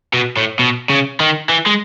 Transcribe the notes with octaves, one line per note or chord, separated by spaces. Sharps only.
B2
A2
B2
C#3
D#3
E3
G#3